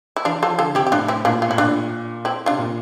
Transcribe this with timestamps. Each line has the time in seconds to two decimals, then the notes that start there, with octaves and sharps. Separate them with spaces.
0.16 E4
0.25 E3 D4 F4
0.42 F3 F4 A4
0.59 D3 F4 A4
0.75 C3 E4 G4
0.87 G4
0.92 A2 D4 F4
1.08 C4 E4
1.25 A#2 A#3 D4
1.42 F4
1.49 A2 E4
1.58 A#2 D4 F4
2.25 C4 E4
2.46 D4 F4
2.51 C3
2.58 A#2